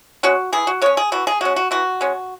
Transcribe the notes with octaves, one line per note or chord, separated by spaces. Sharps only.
G#3 C#4 F#4
E3 G#4
F#4
G#3 C#4 C#5
G#4
E3 F#4
G#4
G#3 C#4 F#4
F#4
E3 F#4
G#3 C#4